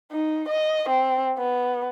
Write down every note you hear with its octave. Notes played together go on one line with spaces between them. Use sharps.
D#4
D#5
C4
B3